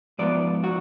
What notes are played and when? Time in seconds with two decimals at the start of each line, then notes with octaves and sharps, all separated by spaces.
0.19 G#2 F3 B3 D5
0.64 F#4